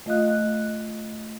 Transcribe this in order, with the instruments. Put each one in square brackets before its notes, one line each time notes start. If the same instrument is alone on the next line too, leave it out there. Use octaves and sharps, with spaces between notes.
[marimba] A3 F4 D#5 F5 D#6 F#6